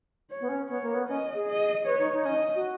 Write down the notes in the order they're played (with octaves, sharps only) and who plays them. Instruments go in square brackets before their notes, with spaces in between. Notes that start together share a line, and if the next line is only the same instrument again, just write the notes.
[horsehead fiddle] C#5
[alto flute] B3
C#4
[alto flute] B3 [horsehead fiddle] C#5
[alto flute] A#3
B3
[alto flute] C#4 [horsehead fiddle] D#5
[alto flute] G#4
[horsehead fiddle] D#5
[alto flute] B4 [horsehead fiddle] C#5
[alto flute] D#4
D#4
[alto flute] C#4 [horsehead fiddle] D#5
[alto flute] D#4
F#4